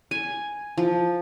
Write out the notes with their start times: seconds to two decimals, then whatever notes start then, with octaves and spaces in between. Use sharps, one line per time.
0.11 G#5
0.78 F3